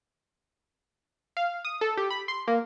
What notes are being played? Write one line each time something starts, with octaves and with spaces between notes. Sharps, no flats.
F5
D#6
A4
G4
B5
C6
A#3